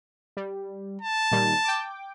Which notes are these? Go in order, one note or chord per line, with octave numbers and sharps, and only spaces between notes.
G3
A5
A#2 D#3 G3
G5 D6